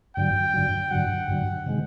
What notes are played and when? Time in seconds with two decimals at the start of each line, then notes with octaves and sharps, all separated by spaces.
0.17 G2 D3 F#3 G5
0.54 G2 D3 F#3
0.91 G2 D3 F#3 F#5
1.28 G2 D3 F#3
1.66 C3 D#3 G#3